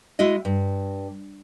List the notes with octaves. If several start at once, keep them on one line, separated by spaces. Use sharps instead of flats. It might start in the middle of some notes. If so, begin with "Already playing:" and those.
G#3 E4 F#4 D#5
G2